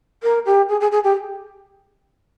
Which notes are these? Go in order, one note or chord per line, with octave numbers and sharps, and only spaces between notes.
A#4
G4
G#4
G#4
G#4
G4